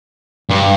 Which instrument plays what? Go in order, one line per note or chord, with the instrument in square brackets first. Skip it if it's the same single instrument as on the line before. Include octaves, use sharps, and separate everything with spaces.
[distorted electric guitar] G2